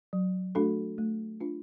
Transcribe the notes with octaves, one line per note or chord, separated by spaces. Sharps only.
F#3
A3 D4 F#4 A4
A3
D4 F4